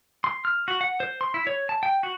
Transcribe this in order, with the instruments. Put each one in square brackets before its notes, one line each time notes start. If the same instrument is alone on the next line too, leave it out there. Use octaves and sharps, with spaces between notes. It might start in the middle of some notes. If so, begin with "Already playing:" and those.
[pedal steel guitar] C6
F6
F#4
F#5
C5
C6
E4
C#5
A5
G5
F#4